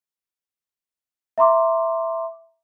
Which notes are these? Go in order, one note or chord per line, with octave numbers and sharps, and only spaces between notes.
E5 A#5 C6 D6